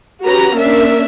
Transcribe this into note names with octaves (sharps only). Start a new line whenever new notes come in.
C#4 F#4 G4 B4 A#5
A#3 C#4 D4 A#4 E5